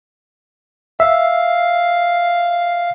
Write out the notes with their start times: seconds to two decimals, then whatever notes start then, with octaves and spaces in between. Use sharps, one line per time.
1.00 E5 F5